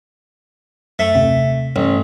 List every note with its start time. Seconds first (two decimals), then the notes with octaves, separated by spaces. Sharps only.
0.99 F#2 A3
1.14 D#2 C3
1.76 A1 G2